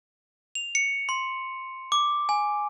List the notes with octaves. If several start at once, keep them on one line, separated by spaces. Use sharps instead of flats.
F7
C#7
C6
D6
G#5